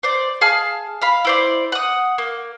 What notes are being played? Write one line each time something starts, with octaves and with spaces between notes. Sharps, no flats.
C5 D5
G#4 F5 A5 F6
F5 B5
E4 C5 D5
F#5 D#6
A#3